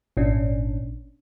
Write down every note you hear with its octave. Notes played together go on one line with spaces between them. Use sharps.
G#1 A#2 C#4 D4